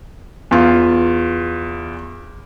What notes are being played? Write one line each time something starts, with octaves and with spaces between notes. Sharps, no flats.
E2 F4